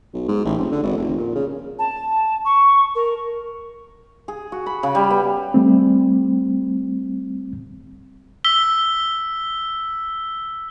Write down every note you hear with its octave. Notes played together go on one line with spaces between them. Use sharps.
B1
G#2
A1
F1
D3
G#1
F1
A#2
C#3
A5
C#6
A#4
G#4
F#4
B5
C#3
G3
B3
G3 A3 C4
E6 B6 G7